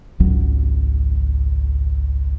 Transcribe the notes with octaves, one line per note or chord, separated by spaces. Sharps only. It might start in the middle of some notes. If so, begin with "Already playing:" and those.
G#1 C#2 F#3